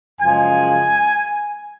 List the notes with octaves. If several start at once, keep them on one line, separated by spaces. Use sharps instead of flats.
F#2 C#3 F3 G#3 G#5